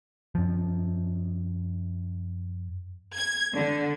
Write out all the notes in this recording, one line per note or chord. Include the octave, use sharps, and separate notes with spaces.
F#2 F3
G#6
D3